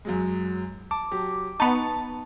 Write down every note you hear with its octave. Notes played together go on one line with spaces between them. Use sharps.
F#2 F#3 G#3
A5 D6
F#3 G4
B3 D#4 A5 C#6 F7